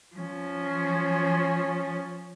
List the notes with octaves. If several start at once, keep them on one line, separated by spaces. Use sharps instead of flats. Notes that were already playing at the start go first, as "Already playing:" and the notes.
F3 C#4